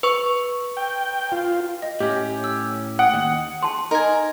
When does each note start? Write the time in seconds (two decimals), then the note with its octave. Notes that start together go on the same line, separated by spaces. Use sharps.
0.03 B4 C#6
0.77 G5
1.32 F4
1.82 D#5
2.00 A2 C#4 G4
2.44 E6
2.99 F#5 G5 D#6
3.14 D#2
3.63 A5 C6
3.91 D#4 A#4 G#5